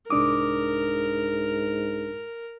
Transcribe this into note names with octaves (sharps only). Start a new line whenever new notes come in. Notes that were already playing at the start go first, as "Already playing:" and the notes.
C2 G#2 D4 A#4 D6 D#6